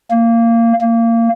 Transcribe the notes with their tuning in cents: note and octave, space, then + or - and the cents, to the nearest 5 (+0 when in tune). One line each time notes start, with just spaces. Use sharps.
A#3 -15
A#3 -20